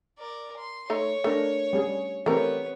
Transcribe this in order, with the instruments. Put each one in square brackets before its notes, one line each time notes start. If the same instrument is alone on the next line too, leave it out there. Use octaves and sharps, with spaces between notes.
[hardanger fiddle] A#4 D5
C6
[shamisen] A3 D#4 A#5 [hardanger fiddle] C#5
[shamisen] A3 [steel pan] D4 A#4
[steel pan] G3 C#4 G#4
[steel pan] E3 C4 G4 [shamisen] A3 A#4 [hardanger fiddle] B3 C#5